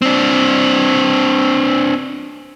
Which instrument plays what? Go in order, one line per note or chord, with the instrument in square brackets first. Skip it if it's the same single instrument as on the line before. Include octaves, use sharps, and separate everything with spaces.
[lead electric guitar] C4 D4